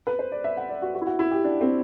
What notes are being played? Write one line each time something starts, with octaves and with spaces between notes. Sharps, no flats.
B4
C5
D5
E5
F#5
D5
F#4
F#4
E4
F#4
E4
G4
D4
C4